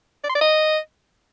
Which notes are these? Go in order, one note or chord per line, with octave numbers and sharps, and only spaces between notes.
D5
C6
D5
D#5